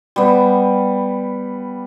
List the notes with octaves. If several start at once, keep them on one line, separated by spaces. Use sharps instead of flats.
G3 B3